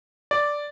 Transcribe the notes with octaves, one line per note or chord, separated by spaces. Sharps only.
D5